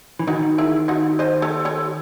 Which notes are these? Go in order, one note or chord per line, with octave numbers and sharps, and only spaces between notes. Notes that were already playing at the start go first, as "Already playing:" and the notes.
E3
D#3 D#4 F#4
E4 G#4
D#4 F#4
C5 D#5
A4 C#5
A4 C#5